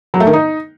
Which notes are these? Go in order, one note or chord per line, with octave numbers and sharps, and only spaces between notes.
F#3
A3
D#3
D#4